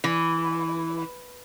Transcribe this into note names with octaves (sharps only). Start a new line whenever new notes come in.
E3